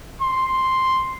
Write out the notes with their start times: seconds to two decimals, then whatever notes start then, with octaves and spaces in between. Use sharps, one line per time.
0.21 C6